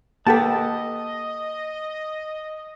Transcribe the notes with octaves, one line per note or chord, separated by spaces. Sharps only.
A#3 G4 A4 B4 D#5 F#5 A5